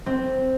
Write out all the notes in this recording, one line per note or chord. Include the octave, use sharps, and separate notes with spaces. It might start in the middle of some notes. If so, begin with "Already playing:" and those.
C4